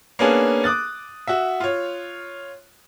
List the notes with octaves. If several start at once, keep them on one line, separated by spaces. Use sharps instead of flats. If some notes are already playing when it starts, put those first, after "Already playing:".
A#3 B3 C#4 D4 G#4
D6 D#6 F#6 A6
F#4 E5
F4 C#5